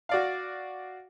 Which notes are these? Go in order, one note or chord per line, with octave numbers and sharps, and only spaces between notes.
F#4 D5 F5